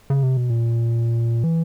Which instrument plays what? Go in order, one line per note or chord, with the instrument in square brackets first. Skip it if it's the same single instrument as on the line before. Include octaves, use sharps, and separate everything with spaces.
[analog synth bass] C#3
C3
B2
A#2
E3